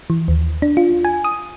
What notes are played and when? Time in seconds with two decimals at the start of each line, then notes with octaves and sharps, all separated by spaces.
0.10 E3
0.28 D#2
0.62 D4
0.77 F4
1.05 G#5
1.24 D#6